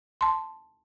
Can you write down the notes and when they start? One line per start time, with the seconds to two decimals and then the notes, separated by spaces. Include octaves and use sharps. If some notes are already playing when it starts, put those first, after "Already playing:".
0.21 A5 C6